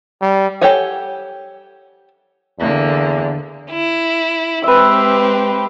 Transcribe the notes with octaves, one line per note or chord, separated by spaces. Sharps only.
G3
G4 A4 C#5 F#5 G#5
E2 D3 A#3
E4
G#3 C4 G4 B4 E5